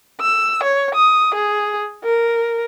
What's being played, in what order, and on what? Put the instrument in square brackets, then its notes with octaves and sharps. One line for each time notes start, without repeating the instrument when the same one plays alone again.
[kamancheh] E6
C#5
D#6
G#4
A#4